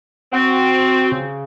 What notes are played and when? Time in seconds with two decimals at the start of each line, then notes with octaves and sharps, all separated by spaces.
0.33 C4 F#4
1.12 C#3